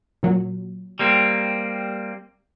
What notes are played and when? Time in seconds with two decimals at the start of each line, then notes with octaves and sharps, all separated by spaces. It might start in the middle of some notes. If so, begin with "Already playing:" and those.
0.23 A#2 F#3
0.99 G3 A#3 C4